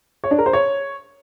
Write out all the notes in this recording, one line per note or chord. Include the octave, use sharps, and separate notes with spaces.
C#5
D4
A#4
C5
C#5